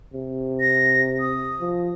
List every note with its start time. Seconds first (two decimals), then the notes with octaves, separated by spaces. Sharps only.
0.14 C3
0.60 A#6
1.20 D#6
1.60 F3